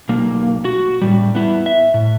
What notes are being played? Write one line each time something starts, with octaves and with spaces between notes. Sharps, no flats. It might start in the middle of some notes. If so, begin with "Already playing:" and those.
B1 A#3
F#4
A2 G3
B3 E4
E5
A2